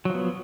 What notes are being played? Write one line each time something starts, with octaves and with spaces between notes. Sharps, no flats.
F3 F#3 B3